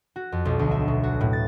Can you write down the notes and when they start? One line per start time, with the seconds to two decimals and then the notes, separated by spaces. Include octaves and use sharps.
0.16 F#4
0.32 F2
0.45 B1
0.59 D2
0.71 E5
0.88 B2
1.03 F#4
1.21 A2
1.33 A6